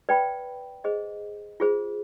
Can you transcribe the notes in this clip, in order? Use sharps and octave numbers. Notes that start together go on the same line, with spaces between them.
B4 D5 G5 B5
G#4 C5 D#5
F4 G#4 C5